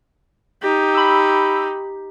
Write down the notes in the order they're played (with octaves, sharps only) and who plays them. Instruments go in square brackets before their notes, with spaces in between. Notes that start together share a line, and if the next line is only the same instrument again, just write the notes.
[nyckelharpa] D#4 G4
[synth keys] B5 E6